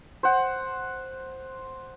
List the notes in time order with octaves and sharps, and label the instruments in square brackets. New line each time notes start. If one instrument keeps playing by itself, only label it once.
[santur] C5 F#5